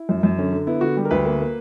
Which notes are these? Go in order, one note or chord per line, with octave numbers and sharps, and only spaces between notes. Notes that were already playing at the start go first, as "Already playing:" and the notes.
Already playing: E4
F#2
F#2
D3 C#4
D3
B3 E4
D3 F#4
G3
A#4
D2 B4
A#3
A#3